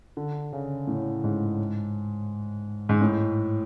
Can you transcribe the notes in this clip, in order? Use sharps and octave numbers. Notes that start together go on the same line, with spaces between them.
D3
C#3
A2
G#2
G#2
A2